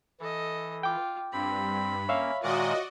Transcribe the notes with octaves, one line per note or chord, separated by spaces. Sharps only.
E3 A4 D#5
F4 G5 D6
G2 C4 B5
A#3 C#4 C#5 E5 F5
A#2 D#3 G#3 F#4 D5 D#5